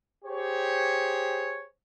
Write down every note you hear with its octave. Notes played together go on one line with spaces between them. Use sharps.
G4 G#4 C5 C#5